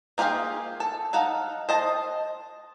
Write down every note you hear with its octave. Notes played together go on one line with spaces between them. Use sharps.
A#3 F4 G4 G#4 F5
A4
D#4 A4 F5 F#5
C5 D#5 A5